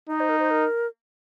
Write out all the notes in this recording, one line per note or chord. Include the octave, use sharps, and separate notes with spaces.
D#4 D#5
C5
A#4
C5
A#4